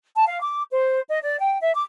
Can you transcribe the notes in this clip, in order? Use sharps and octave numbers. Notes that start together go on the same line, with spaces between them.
A5
F5
D6
C5
D#5
D5
G5
E5
D6